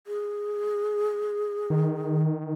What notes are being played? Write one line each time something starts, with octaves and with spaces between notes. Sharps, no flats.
G#4
D#3